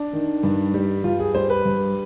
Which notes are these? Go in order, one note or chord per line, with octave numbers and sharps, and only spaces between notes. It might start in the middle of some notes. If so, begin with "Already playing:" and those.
Already playing: D4
D#3
G2
G3
G2 F4
G#4
G3 C5
B4
G2